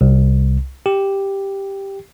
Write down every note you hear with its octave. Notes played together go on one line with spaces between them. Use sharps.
C2
G4